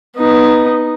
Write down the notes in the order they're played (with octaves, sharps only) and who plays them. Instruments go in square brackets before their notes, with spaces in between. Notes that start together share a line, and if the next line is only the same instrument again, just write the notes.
[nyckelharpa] B3 D#4